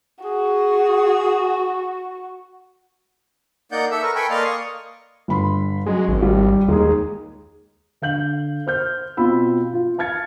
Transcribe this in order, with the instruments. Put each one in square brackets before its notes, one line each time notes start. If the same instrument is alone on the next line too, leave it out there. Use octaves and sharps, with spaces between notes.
[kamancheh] F#4 [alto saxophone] G#4
[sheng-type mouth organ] A#3 D#4 D5 F#5 G6
A4 E5 E6
A#4 B4 C#6
A4 B4 G5 G#5 B5 C#6
A#3 D5 D#5 F5 C6 F6
C#6 D#6
[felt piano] G1 B5 C6
[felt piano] F#2 F#3 [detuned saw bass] G#3
[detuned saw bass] G#1
[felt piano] G3
[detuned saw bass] D#2 [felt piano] G#3 D#4 G#4
[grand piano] D3 F5 G6 F#7
C5 F6 G6
B2 C4 F4 B5 E6
F4
F5 A5 F6 G#6 A6 C#7